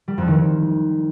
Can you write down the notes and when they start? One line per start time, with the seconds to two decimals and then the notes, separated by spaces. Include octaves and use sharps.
0.08 G3
0.18 F2
0.28 D#3